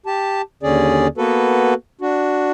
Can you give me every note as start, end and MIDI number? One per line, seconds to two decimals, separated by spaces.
0.06 0.42 67
0.06 0.42 81
0.63 1.07 39
0.63 1.07 50
0.63 1.07 61
0.63 1.07 68
0.63 1.07 74
1.18 1.74 58
1.18 1.74 59
1.18 1.74 66
1.18 1.74 69
1.18 1.74 71
2.01 2.52 62
2.01 2.52 66